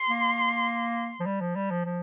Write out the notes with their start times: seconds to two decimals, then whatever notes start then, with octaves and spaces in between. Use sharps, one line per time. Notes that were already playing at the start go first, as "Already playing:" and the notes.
Already playing: C6
0.08 A#3
1.20 F3
1.26 G3
1.41 F3
1.55 G3
1.71 F3
1.85 F3